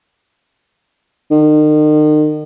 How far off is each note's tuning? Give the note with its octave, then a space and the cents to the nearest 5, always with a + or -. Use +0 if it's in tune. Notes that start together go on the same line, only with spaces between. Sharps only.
D#3 -40